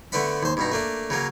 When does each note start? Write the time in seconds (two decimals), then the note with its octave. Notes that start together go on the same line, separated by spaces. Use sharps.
0.12 D3 A3 B3 D4 F#5 B5
0.43 D#2 C5
0.57 G2 B2 D#4
0.72 A3 A#3 D4
1.10 C#3 F#3 A#3